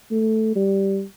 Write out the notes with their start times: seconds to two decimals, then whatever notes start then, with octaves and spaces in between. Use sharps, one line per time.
0.11 A3
0.56 G3